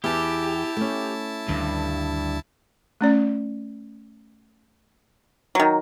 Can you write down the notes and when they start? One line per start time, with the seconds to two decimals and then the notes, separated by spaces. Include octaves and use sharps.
0.04 E2 E4 G4 A5
0.77 A3 C#4
1.48 D2 G2 D#3 G3
3.01 A3 C#4 D5
5.55 D#3 F#3